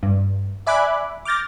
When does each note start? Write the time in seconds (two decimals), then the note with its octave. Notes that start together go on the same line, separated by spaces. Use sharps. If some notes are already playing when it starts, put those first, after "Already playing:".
0.03 G2
0.66 D5 E5 G#5 B5 D6 F#6
1.25 D6 F6 G6 A6 A#6